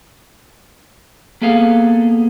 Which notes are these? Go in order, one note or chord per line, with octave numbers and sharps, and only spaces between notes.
A#3 B3 G#4 A4 F5